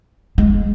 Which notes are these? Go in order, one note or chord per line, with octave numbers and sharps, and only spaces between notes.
G#3